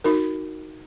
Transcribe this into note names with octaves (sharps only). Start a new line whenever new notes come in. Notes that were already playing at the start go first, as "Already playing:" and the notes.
D#4 F#4 A#4